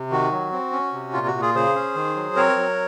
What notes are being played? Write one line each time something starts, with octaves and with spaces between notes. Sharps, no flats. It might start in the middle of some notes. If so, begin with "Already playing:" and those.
Already playing: C3
D#3 F#4
F#3
C4
C#4
C3
A#2 F4
F#4
A#2
F4 G#4
C#3 G#4 C5
C#4
D#3
F#3
C4 A#4 C#5
F#3